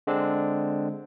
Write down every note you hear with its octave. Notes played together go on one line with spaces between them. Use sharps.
D3 G#3 C4 D4